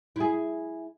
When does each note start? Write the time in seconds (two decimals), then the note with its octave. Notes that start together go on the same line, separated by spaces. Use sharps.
0.16 E4 G#4